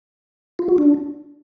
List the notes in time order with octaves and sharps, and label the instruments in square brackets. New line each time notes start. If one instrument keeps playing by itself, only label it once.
[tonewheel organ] F4
F#4
D4